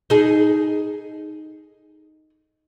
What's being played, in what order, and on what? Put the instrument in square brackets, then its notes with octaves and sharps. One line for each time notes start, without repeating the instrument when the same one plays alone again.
[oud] D#4 G#4